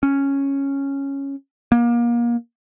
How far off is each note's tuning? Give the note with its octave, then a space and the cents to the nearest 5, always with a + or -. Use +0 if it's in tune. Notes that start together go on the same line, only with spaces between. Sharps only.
C#4 -5
A#3 +30